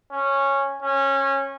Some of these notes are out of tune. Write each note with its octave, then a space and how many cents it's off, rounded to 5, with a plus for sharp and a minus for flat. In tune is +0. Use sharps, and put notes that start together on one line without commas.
C#4 -10
C#4 -20